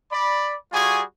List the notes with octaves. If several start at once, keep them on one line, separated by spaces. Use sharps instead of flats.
D5 B5
G3 F4 F#4 G#4 G#5 C#6